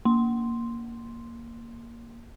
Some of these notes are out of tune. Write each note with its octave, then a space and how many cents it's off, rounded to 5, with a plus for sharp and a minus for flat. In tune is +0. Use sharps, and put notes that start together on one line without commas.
A#3 +0 C6 +0